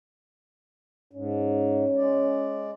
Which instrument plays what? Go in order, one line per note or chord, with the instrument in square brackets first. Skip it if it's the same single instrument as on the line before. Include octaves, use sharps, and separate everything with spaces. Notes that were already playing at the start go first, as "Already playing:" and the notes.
[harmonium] G#2 [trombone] C#4
[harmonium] G#3 D5